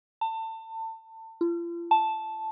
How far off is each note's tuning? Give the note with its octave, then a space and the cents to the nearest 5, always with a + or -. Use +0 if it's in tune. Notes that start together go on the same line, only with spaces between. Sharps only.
A5 +30
F4 -40
A5 -5